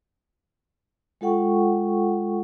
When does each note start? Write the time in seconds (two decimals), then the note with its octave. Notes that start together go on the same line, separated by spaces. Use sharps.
1.21 G#3 F4 A4 F#5 G5 C#6